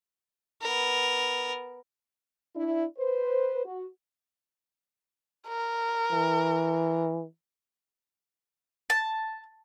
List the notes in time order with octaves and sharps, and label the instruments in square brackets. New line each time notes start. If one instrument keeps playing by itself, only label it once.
[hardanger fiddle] B3 A#4
[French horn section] D4 E4
B4 C5
F#4
[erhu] A#4
[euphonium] E3
[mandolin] A5